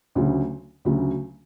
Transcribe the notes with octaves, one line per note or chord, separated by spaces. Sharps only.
D2 C#3 F#3
D2 C#3 F#3